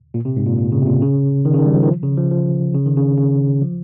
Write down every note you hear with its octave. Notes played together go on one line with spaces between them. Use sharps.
A#2
C3
G#2
A#2
A#2
C#3
C3
A#2
C#3
D#3
C#3
D#3
G3
F3
D#3
F3
C#3
F3
F3
C#3
D#3
C#3
C#3
F3